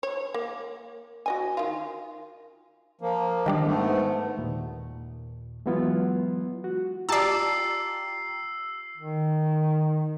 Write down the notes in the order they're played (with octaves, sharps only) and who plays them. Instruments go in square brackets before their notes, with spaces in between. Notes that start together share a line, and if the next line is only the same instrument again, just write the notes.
[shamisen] C#5
A#3
F#4 D#5 G#5
D#3 F4
[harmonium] F3 A#3
[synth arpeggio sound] D#3 G3 D4
[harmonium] G#2 A3 B3
[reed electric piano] D#2 A#2
E3 F#3 G#3 B3 E4 F4
F#4
[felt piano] F4 G4 [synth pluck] D5 A5 [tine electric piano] A#5 [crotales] E6 C7
[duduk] D#3